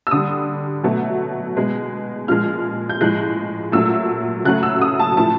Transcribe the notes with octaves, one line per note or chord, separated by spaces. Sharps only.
E6
D3 G3 D#6
B2 F#3 A3
B2 G#3
A#2 F3 G#3 F6
G6
A2 F3 G#3 F#6
A#2 F#3 A3 E6
C#3 F#3 A3 F#6
E6
D#6
A5
A2 F3 A3 A5